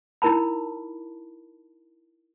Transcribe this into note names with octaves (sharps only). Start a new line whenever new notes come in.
D#4 E4 A#4 A5 B5